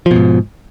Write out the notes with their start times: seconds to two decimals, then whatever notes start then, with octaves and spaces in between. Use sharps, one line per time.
0.06 F3
0.11 B2
0.16 G#2